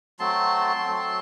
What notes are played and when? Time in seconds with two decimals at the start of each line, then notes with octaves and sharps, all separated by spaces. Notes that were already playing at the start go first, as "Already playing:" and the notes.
0.20 F#3 A3 C4 A5 C6
0.86 F#3 A3 C4